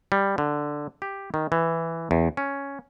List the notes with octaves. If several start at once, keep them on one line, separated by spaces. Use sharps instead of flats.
G3
D3
G4
D#3
E3
E2
C#4